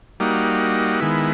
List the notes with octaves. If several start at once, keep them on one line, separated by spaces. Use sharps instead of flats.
G3 A#3 D#4 F#4
D#3 G#3 B3 E4